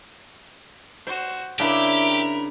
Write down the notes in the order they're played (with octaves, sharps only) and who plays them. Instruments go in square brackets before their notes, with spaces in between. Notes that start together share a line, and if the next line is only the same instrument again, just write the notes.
[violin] F#4 E7 [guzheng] C5
[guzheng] C#3 D4 E4 [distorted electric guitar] G4 [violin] A#4 B5